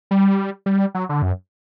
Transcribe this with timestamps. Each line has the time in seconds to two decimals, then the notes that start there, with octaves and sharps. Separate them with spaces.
0.11 G3
0.66 G3
0.95 F#3
1.09 D3
1.22 F#2